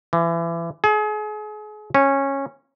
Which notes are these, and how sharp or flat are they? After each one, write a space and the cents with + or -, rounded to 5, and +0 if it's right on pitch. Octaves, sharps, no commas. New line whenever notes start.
E3 +30
G#4 +35
C#4 -15